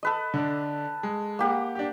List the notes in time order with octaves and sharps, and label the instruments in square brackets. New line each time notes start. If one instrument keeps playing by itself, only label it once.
[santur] A4 B4 D#5
[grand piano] D3 D4
G#3
[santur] A#3 G4 F#5
[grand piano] D4 G4